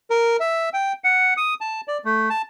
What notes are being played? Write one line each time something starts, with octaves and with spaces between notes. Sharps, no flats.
A#4
E5
G5
F#5
D#6
A5
D5
A3
A5